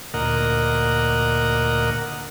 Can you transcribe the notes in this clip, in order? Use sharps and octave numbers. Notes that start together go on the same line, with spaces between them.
D2 A#2 A#4 D#5 F#5